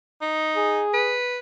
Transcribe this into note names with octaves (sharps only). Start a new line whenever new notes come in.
D#4
G#4
B4